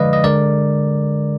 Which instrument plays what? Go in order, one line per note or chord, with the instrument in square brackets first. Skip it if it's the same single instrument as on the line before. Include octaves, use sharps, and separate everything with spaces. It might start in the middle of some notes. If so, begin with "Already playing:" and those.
Already playing: [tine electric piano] D3 F3 G#3 B4 D5 D#5 F5
D#5
D3 G#3 A#4 D5